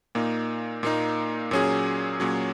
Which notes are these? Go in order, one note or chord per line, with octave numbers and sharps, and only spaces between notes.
A#2 A#3 D#4
A#2 A#3 D#4
A#2 F#3 C#4 G#4
A#2 F#3 C#4 G#4